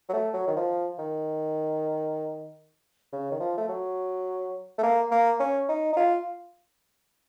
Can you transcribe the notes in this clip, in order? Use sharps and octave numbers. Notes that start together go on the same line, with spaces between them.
F#3
A3
F#3
D#3
F3
D#3
C#3
D#3
F3
A3
F#3
A3
A#3
A#3
C#4
D#4
D#4
F4